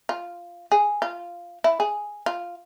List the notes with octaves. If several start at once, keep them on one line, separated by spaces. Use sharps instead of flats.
F4
G#4
F4
E4
G#4
F4